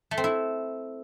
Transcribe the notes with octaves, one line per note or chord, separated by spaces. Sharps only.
A3
C4
E4